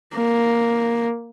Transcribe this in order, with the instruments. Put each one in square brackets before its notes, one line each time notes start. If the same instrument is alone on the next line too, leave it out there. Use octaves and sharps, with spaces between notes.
[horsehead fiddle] A#3